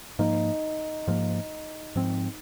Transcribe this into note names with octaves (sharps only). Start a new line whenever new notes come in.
G#2 F3 A#3 D#4
G#2 F3 A#3
G#2 F3 C4